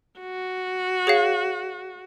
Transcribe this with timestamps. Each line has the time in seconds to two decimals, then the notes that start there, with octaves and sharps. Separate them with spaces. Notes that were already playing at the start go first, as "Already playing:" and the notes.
0.19 F#4
1.07 G#4 C#5 F5